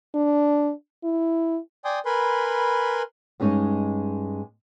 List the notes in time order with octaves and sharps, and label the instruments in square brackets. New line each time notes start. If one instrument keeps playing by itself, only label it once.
[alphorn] D4
E4
[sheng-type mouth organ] D5 G5 G#5 C6 D#6
A#4 B4 G#5 B5 C6
[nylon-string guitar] G2 G#3 C#4 D#4 D#5